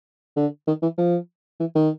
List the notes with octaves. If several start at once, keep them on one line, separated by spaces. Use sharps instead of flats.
D3
D#3
E3
F3
E3
D#3